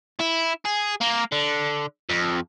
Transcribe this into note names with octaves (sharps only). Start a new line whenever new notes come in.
E4
G#4
A#3
D3
F2